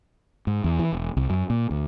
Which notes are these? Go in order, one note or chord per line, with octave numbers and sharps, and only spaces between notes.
G#2
E2
E3
E1
C2
F#2
A#2
D2